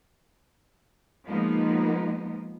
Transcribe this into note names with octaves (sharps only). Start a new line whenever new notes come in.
F3 G#3 A#3 B3 D#4